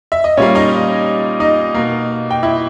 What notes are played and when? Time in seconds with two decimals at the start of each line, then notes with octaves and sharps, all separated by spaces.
0.12 E5
0.24 D#5
0.37 A#2 G3 A#3 C#4 C#5
0.55 D#4 D#5
1.40 D#4 D#5
1.75 B2 A#3
2.31 G5
2.43 E4 E5